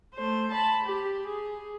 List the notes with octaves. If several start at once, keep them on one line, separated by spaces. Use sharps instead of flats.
A3 C5
A5 B5
G4
G#4